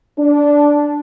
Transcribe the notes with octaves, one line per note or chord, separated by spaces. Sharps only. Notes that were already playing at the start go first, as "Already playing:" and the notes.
D4